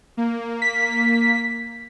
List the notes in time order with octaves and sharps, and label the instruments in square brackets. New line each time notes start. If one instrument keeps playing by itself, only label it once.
[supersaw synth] A#3
[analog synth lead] B6